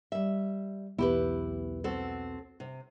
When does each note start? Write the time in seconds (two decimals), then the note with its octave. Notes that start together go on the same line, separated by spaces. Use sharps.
0.12 G3 E5
0.98 B1 E2 B3 E4 G4 B4
1.84 C4 F#4 A4
2.60 C3